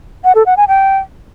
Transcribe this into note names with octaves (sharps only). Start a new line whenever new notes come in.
F#5
A4
F#5
G#5
G5